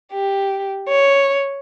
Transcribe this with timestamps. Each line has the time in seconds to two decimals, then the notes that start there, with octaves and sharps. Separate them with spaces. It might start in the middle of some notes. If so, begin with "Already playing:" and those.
0.13 G4
0.88 C#5